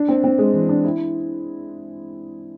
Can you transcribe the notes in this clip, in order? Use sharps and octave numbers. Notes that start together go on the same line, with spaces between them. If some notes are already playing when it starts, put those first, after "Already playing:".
Already playing: D4
C4
C4
G#3
E3
D4
E4